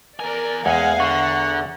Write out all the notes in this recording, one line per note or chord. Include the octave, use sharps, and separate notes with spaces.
E2 A#4 D5 G#5
E2 G#3 F5 F#5 G#5
D3 F#5 A#5 C#6